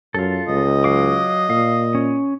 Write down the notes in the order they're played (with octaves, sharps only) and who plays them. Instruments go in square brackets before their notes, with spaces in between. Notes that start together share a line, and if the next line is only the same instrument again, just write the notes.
[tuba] F#2 [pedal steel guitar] F4 A4
[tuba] C#2 [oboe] D#5
[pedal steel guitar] F#3 F5 D6
[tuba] A#2 [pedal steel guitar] F5
[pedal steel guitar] C#4